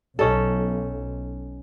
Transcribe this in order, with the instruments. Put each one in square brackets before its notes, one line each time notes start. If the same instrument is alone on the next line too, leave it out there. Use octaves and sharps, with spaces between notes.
[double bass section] B1 [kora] C#4 D#4 A4